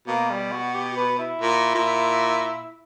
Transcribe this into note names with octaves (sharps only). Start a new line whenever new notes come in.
B2 A#3
G3
F#4
G4
B4
E4
A#2
A#2